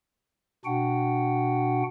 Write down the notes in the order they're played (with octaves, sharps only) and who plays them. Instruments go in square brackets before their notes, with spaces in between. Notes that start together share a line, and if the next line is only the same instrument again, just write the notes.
[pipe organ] B2 D4 F#4 F#5 G5